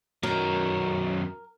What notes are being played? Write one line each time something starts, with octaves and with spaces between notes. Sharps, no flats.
F#2 D#3 F#3 A#4